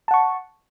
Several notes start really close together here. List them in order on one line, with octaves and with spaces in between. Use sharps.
A5 F#5 C#6